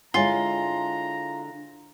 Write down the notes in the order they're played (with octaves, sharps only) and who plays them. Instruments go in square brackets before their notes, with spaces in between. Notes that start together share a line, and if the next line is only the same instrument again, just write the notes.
[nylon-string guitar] D3 G#3 E4 [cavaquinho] F4 [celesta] C#5 G#5 G7 [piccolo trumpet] A#5